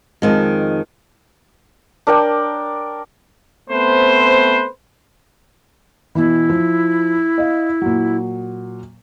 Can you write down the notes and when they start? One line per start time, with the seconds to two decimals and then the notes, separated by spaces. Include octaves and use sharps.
0.22 F2 D#3 G#3
2.07 D4 A#4 D5 G5
3.70 A3 B3 C4 B4 C5
6.15 B2 E3 E4
6.50 F3
7.38 D#5 F5
7.82 A#2 F#3